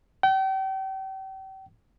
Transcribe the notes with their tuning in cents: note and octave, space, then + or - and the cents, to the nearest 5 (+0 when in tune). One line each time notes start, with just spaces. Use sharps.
G5 -35